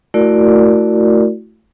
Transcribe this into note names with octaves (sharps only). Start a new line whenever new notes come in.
A3 E4 F#4 A#4 D5